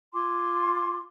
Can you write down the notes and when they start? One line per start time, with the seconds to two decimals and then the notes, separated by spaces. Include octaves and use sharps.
0.13 F4 G#5 C6 D6